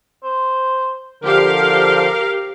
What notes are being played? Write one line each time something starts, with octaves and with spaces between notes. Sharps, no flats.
C5
D3 F3 G4 A#4 F5